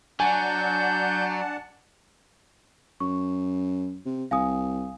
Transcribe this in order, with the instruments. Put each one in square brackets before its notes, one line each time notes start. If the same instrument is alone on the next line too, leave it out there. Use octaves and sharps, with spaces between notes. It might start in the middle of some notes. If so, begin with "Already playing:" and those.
[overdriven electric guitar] F#3 [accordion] D4 F#5 A5 [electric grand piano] G#5 [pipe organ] G6
[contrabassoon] F#2 [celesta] C#6
[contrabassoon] C3
[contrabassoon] C2 [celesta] F5 G#5 D#6